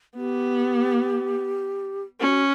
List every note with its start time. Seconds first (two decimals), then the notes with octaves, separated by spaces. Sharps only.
0.16 B3 G4
2.21 C#4 F#4